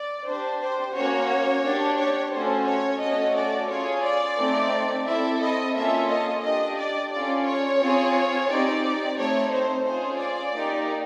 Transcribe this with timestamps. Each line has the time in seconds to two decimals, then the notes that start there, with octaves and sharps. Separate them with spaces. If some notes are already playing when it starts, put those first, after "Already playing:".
Already playing: D5
0.26 D4 G4 C5
0.60 C5
0.95 A#3 C#4 F#4 C#5
1.63 D4 G4
1.98 C#5
2.31 A3 C#4 F#4 A4 C5
2.65 C#5
3.00 A3 C#4 F#4 A4 D#5
3.34 D5
3.68 C#4 F4 G#4 C#5
4.03 D5
4.37 A3 C4 D#4
5.05 C4 E4 A4 E5
5.40 D#5
5.74 A#3 C#4 F4 A4 E5
6.08 D#5
6.42 D4 G4 D#5
6.77 D5
7.11 C#4 F4 A4 D5
7.45 C#5
7.79 C4 F4 G#4
8.48 C4 D#4 G4 D5
9.16 A3 C4 D#4 C#5
9.50 C5
9.85 C#4 F4 G#4 C5
10.19 D5
10.54 A#3 D#4 G4